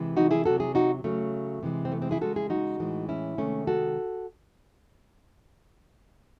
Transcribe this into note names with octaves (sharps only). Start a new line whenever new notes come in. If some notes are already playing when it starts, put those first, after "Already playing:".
Already playing: C3 E3 G#3
D#4 F#4
E4 G#4
C3 F#3 F#4 A4
E4 G#4
D#4 F#4
C#3 F#3 A3
C3 E3 G#3
C4
A3
G#3 C4
E4 G#4
C#3 G#3 F#4 A4
E4 G#4
D#4 F#4
A2 E3 G#3
C#4 E4
C3 D#3 G#3 A3 C#4
F#4 A4